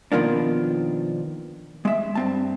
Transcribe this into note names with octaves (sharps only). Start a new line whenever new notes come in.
B2 D#3 F3 A#3 D4
G#3 E5
G2 C4 A5